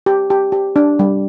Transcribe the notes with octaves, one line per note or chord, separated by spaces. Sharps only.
G4
G4
G4
D4
G3